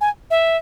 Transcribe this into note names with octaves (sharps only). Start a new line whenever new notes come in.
G#5
E5